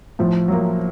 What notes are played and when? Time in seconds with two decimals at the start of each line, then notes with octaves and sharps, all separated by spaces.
0.19 A2 F3
0.48 F#3 A#3